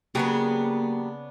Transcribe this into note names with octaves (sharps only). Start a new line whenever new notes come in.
C#3 F#3 A#3 B3 D4 G4 G#4